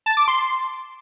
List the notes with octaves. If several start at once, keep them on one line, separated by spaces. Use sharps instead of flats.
A5
D6
C6